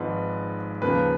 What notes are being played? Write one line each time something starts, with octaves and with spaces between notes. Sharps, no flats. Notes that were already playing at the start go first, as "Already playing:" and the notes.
Already playing: G#1 G#2 F3 G#3 B4
D#2 C#3 F3 A#3 B4